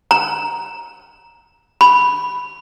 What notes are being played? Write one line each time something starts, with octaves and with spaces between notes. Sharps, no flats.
A#5
B5